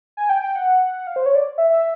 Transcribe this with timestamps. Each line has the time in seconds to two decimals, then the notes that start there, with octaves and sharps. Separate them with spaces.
0.17 G#5
0.30 G5
0.42 G5
0.56 F#5
1.07 F5
1.16 C5
1.26 C#5
1.35 D5
1.58 E5
1.70 E5